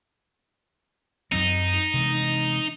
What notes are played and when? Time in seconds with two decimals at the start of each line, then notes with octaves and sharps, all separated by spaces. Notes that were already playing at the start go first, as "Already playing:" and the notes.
1.32 F#2 F#3 C4 D#4
1.94 C3 E3 G#3